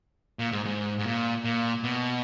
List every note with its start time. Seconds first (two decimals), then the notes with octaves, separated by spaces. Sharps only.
0.39 A#2
0.52 G#2
0.65 G#2
0.99 G#2
1.05 A#2
1.44 A#2
1.84 B2